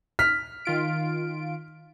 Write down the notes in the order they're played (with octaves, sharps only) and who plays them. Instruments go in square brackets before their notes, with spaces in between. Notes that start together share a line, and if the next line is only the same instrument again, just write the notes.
[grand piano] F6 B6
[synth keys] D#3 F4 D7